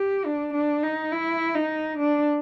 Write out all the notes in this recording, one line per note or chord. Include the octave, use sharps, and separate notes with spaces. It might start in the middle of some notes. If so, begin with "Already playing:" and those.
Already playing: G4
D4
D4
D#4
E4
D#4
D4